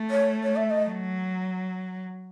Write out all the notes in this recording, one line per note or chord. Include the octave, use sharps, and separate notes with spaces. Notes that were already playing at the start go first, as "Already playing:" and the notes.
Already playing: A3
C#5
C#5
E5
D#5
F#3